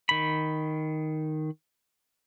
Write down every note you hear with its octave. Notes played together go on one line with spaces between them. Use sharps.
D#3 B5